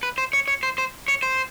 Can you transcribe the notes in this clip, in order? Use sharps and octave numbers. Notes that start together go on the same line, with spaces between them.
B4
C5
C#5
C#5
C5
C5
C#5
C5